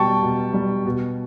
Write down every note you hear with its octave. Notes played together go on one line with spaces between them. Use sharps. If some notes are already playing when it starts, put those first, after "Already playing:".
Already playing: B2 G3 G5 A5 C#6
B2
G3
B2